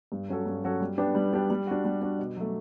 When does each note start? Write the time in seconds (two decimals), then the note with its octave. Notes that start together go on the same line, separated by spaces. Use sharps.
0.12 G2
0.29 F#3 C#4 F#4 A4
0.46 G2
0.64 F#3 C#4 F#4 A4
0.81 G3
0.98 B3 D4 G4
1.15 G3
1.32 B3 D4 G4
1.50 G3
1.67 D4 F#4
1.84 G3
2.02 D4 F#4
2.19 B2
2.37 F#3 A3